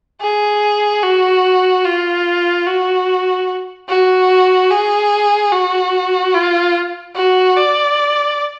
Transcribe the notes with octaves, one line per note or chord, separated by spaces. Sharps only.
G#4
F#4
F4
F#4
F#4
G#4
F#4
F4
F#4
D5